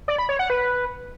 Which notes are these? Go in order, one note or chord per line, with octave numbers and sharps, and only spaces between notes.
D5
B5
C#5
F#5
B4